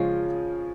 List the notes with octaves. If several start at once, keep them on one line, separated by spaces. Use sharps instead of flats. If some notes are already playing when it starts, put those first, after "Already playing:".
Already playing: C#3 F3 G#3 C#4 F4